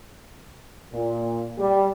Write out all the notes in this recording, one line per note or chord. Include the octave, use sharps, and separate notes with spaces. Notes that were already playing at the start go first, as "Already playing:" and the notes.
A#2
G3